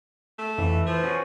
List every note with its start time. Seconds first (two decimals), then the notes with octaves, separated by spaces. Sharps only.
0.39 A3
0.58 F2 E3
0.87 F3 B4
1.04 C#4 F#4 G#4